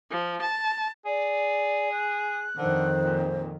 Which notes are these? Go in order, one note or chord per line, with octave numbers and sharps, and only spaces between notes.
F3
A5
G#4 D5
F#6
F2 D3 D#3 C5
A#2